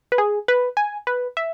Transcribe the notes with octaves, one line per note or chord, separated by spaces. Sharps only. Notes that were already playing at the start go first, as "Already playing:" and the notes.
B4
G#4
B4
G#5
B4
E5